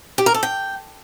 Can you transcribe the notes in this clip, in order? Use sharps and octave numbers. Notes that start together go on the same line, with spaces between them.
G4
A#4
A4
G5